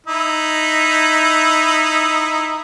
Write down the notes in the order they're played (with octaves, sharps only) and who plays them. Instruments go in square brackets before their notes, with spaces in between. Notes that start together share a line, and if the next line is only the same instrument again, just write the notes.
[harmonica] D#4 E4